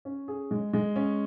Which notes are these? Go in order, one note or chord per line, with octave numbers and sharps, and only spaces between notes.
C#4
G#4
G#3
G#3
C#4